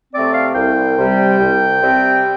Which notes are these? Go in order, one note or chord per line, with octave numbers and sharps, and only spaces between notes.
C3 A3 C4 D5
F5
C2 G5
C3 G3
C2
C3 G3 C4